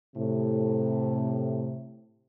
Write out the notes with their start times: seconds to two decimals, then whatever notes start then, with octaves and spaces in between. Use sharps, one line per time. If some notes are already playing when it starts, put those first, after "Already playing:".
0.16 A2 C3